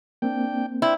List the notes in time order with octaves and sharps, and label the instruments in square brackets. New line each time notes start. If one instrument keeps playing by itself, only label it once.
[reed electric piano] A#3 C4 [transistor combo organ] D4 G5
[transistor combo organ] D4 C5 G5 [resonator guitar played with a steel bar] E4